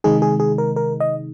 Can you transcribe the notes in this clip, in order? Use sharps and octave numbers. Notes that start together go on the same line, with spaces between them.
C3 D#3 G#3 D#4 G#4
G#4
G#4
A#4
A#4
D#5